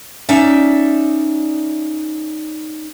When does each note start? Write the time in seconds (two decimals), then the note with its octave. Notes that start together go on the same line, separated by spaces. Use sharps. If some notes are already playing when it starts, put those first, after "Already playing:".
0.29 C#4 D#4 D5 E5